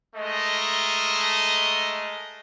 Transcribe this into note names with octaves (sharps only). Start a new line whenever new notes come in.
G#3 A3 A#4 D#5